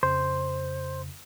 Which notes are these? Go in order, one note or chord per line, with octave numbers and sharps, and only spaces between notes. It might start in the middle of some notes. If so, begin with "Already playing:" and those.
F2 C#3 C5